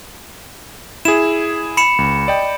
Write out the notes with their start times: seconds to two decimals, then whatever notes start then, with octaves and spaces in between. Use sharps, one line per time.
1.05 E4 G#4 E7
1.77 B5 C#7 E7
1.98 C#2
2.28 D5 D#5 G5